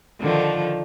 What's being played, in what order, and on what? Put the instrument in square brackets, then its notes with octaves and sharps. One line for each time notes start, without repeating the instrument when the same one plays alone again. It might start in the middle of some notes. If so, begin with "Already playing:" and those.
[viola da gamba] D3 D#3 F3